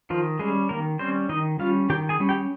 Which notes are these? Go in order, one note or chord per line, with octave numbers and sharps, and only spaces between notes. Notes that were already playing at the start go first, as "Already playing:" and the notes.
D#3 F3 F4
G3 G#3 C#4 G#4
D#3 A#3 A#4
G3 C4 C#4 C5
D#3 D#4 D#5
G3 C#4 F4 F5
D#3 G4 G5
G#4 G#5
G3 C#4
G4 G5